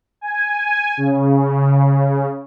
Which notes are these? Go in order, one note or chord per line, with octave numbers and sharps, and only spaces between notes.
G#5
C#3